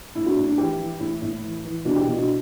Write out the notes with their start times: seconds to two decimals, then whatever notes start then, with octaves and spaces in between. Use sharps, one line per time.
0.15 A2 E4
0.26 D4 F#4
0.37 A2
0.47 D4
0.58 E3 E4 G4
0.79 E3
1.00 A2 E4
1.22 A2
1.43 E3
1.65 E3
1.85 B2 D4 F#4
1.96 E4 G4
2.07 B2 E4
2.18 D4 F#4